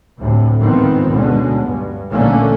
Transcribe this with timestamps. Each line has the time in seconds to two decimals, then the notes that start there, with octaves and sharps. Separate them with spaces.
0.17 D2 A2 C3
0.58 G#2 D#3 F3 B3 C4
1.10 D2 B2 D3 G#3 C#4
1.61 G2
2.10 A1 A#2 D3 A3 A#3 C#4